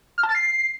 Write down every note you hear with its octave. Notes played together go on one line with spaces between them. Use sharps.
F6
A5
A6
C7